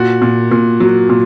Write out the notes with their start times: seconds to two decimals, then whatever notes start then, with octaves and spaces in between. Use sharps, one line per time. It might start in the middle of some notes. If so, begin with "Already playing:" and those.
Already playing: A#2 F#4
0.22 A#2
0.51 A#2
0.80 F#3
1.09 A#2